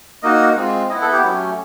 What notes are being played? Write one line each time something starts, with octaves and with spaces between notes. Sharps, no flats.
A#3 D#4 F#4 D#5
G#3 C4 F4
B3 E4 D#5
A4
G4
F#3 A3 C#4